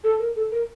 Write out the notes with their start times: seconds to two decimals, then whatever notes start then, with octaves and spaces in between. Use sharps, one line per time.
0.04 A4
0.19 A#4
0.36 A4
0.52 A#4